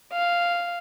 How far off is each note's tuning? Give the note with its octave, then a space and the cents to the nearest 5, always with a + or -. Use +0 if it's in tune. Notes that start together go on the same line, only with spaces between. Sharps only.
F5 -5